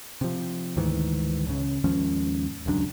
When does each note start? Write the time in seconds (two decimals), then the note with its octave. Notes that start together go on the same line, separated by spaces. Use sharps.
0.21 C3 F3
0.76 D2 G#2 D#3 E3
1.46 C#2 C#3
1.84 D#2 G#2 F3 C#4
2.66 D#1 C#2 F#2 D4